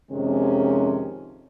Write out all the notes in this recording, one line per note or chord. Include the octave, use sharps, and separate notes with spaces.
F2 C3 D#3 G#3 C#4